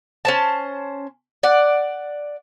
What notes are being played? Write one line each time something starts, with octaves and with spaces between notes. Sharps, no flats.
C#4 C5 A5
D5 F#5